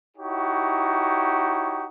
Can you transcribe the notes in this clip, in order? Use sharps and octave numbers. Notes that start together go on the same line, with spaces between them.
D#4 E4 F#4 G4 C#5